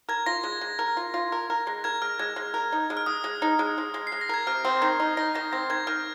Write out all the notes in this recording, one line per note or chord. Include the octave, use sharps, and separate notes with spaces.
A#4 G#6
F4 A#6
G#3
G#3
A#4
F4
F4
A#4
A#4
G#3
A#4 G#6
G#3 F6
G#3 G#6
G#3
A#4
D#4
G#3
F6
G#3 D#6
G#3
D#4
G#3
G#3
G#3
C7
G#3
A#6
A#4 G#6
C3 F6
C4
D#3
D#4
D#4 A#6
D#3 A#6
C4 A#6
D#3 G#6
D#3 F6